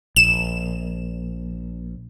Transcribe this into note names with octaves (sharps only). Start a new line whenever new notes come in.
A#1 E7